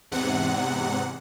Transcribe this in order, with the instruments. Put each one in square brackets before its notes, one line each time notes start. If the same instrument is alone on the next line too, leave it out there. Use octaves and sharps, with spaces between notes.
[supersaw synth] E2 G#2 C3 F#5